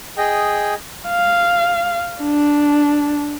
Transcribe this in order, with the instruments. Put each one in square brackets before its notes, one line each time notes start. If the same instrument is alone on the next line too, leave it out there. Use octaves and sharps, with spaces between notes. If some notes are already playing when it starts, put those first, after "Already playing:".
[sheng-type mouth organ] G#4 D#5 G5
[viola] F5
D4